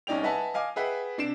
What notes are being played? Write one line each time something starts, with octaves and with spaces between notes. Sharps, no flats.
C2 C#4 D#4 D5 G5 F7
B4 D#5 E5 F#5 G#5 A5
D#5 F5 G#5 D6
G#4 B4 E5 F#5 G5
C3 D4 C7 D7 E7